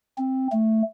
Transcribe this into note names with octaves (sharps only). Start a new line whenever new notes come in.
C4
A3